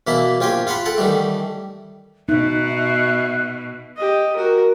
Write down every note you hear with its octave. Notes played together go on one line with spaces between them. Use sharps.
B2 E3 A#3 E4 E5
A#1 F4 G4 G5 G#5 C6
F4 F5 F#5 B5 C6
A4 F#5 G5 A5
D#3 E3 G3 A3
B2 D#4 E5 F#6
G4 D#5
F#4 A#4